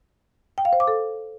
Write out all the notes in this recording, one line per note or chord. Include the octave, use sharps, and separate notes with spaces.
G5
F5
C5
D6
A4